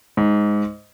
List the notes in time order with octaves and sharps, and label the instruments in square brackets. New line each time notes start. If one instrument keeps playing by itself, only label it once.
[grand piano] G#2